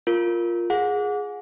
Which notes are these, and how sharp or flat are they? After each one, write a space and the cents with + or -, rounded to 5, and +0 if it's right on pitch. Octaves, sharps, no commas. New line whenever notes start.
F4 +0 A#4 +0
G#4 +0 F#5 -30